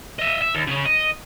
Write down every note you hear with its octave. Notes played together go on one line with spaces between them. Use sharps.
D#5 E5
E5
D#2
C#3 C#4
D#5